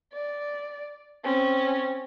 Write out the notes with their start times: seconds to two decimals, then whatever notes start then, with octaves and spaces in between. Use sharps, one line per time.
0.12 D5
1.24 C4 C#4